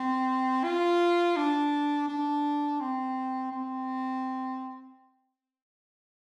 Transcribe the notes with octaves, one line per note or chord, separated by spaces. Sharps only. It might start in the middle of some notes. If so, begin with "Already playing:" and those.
Already playing: C4
F4
D4
D4
C4
C4